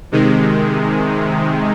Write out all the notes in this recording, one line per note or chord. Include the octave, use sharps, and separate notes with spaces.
C3 D#3 G#3